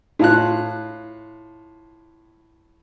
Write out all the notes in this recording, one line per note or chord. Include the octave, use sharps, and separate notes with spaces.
A2 F4 F#6